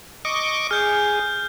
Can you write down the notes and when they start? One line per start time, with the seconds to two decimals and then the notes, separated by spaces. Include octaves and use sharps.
0.25 D#5 C#6 D6
0.71 G#4 F6 G6